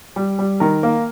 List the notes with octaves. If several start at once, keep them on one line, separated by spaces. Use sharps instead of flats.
G3
G3
D#3 A#4
A#3